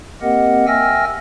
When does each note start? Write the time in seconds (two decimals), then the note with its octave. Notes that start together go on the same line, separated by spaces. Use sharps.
0.22 A#3 C4 G4 A#4 D#5 F#5
0.67 E5 G5 G#5 E6 F6 A#6